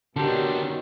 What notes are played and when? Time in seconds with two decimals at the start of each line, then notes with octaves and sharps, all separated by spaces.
0.16 B2 D3 D#3 F#3 D4 G4 A4 C5